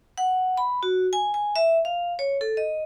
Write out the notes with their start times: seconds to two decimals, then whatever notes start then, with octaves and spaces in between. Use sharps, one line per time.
0.18 F#5
0.57 B5
0.83 F#4
1.13 G#5
1.34 G#5
1.56 E5
1.85 F5
2.19 C#5
2.41 A4
2.57 D#5